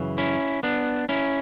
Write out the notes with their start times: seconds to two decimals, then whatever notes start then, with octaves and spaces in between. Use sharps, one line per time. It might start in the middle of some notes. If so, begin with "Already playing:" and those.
Already playing: F#2 C#3 E3
0.18 C#4 E4
0.63 B3 D4
1.09 C#4 E4